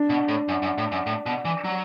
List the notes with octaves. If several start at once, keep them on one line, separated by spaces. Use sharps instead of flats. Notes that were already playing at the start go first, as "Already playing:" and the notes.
Already playing: D4
B2
A2
F#2
F#2
A2
F#2
A2
B2
E3
F#3